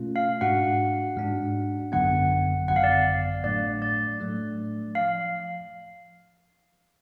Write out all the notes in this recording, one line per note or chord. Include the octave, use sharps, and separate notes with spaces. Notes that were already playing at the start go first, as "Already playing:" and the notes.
Already playing: B2 A3 C#4 F4
F5
G#2 G#3 D4 F#4 F#5
G#2 G#3 D4 F#4
G#1 F#2 D3 F#3 B3 F#5
G#1 F#2 D3 F#3 B3 F#5
F5
D5
F5
A2 F#3 A3 D4 D5
D5
A2 F#3 A3 D4
F5
F3